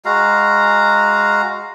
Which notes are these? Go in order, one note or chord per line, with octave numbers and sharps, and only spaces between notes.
G#3 F#4 F5 A#5